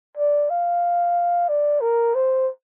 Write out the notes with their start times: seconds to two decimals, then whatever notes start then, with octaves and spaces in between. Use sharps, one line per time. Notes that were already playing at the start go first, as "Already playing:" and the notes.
0.17 D5
0.50 F5
1.49 D5
1.81 A#4
2.15 C5